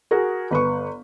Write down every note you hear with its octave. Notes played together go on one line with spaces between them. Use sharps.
F#4 G#4 A#4
G1 B4 C#6